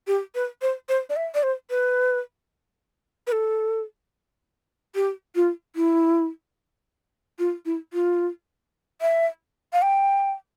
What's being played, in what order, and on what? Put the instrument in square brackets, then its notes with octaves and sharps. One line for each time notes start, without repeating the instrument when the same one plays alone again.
[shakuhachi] G4
B4
C5
C5
D5
E5
D5
C5
B4
B4
A4
G4
F4
E4
F4
E4
F4
E5
F5
G5